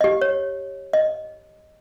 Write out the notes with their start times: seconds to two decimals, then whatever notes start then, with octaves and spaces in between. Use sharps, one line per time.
0.01 G4 D#5
0.21 C#5
0.93 D#5